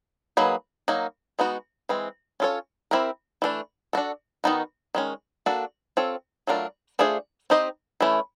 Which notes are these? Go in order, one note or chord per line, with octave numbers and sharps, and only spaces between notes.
F#3 A#3 D#4 G#4 B4
F#3 A#3 D#4
G#3 B3 D#4 F#4
E3 G#3 C4
C#4 F4 A4 C#5
C4 E4 G4 A#4
E3 A3 D4
D4 F#4 A4
D#3 G#3 B3 D#4 F#4
D#3 G#3 C#4
A#3 D4 F#4 A4
C4 F4 A4 C#5
F#3 A3 D4 F4 A#4
A3 D4 F4 G#4 C5
C4 D#4 G4 C5 D#5
E3 A3 C#4 E4